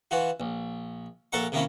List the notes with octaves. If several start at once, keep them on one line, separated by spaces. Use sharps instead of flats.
E3 F4 F#4
A#1
A#1 A4 A#4 E5 F#5 C#6
C3 D#3 A#3 C#4 E4